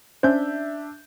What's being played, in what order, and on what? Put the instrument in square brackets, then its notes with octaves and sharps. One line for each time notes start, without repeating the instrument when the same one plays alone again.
[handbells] C#4 C5 [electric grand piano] D4 E5 G6